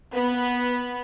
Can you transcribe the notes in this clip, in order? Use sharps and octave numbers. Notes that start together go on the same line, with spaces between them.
B3